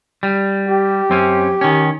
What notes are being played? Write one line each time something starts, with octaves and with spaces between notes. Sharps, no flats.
G3
G4
F#2 C4 C#4
D#3 C#4